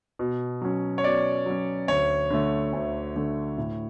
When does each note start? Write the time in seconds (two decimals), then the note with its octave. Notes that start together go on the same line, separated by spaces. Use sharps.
0.19 B2
0.62 F#3 C#4
0.98 C#5
1.04 B2 D5
1.46 F#3 C#4
1.88 D2 C#5
2.30 D3 A3
2.73 D2
3.16 D3 A3
3.58 A2